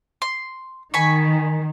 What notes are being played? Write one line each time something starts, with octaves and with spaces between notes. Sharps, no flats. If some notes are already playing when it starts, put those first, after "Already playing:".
C6
D#3 G#5 B5 C#6